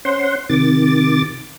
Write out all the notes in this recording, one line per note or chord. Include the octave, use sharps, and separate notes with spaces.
C#4 C5 F#5 C6
C3 D#3 D6 A6